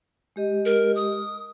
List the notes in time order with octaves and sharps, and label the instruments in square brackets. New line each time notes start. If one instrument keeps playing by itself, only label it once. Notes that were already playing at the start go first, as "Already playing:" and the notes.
[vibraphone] G#3 G4 D#5
[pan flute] A#4
D#6